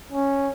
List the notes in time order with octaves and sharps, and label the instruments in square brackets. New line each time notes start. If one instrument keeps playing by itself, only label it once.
[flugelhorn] C#4